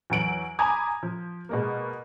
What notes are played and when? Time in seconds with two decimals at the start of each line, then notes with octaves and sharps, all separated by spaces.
0.10 E2 F#3 D7 F#7
0.59 G#5 A#5 B5 D6 D#6 G#6
1.03 F3
1.49 B2 G#3 A#3